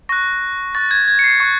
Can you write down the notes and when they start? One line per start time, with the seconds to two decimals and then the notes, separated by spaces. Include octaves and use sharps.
0.09 C#6 F#6 A#6
0.75 C#6 F#6 A6
0.91 G#6
1.08 G#6
1.19 C#7
1.24 C7
1.40 C#6 F#6